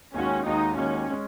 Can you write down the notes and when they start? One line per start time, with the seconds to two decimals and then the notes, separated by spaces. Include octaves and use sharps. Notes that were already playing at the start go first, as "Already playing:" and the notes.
0.14 D#2 D#3 G#3 C#4 F#4
0.46 D#2 D#3 G#3 D#4 F#4
0.77 D#2 D#3 G#3 C#4 F#4
1.10 G#3 C#4